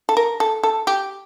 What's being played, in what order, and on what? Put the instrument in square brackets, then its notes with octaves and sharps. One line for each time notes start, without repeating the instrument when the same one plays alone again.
[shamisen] A4
A#4
A4
A4
G4